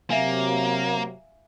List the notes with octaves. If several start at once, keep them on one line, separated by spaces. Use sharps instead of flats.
C3 F#3 A#3 E5 F5 G#5